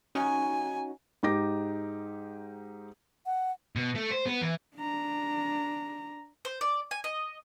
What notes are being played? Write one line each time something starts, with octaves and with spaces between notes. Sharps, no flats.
C#4 D#4 F#4 G#5
G#2 D#4 G4 D6 A#6
F#5
B2
A3
C5
B3
E3
D4 A#5
C5
D5
G#5
D#5